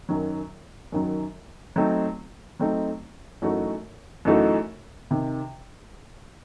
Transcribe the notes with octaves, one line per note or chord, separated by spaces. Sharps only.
F#2 D#3 F#3
F#2 D#3 F#3
F#3 A3 C4 D#4
F#3 A3 C4 D#4
F#2 E3 A3 D#4 F#4
F#2 E3 A3 D#4 F#4
C3 D#3